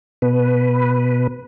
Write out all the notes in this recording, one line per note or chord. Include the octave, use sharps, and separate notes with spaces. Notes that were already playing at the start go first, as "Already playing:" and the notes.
B2 B4